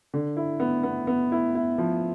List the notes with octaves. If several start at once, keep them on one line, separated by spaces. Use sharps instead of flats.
D3
E4
B3
B3
B3
E4
E4
F3